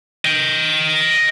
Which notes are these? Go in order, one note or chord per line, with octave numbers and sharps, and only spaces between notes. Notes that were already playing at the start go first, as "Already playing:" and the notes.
D#5 G5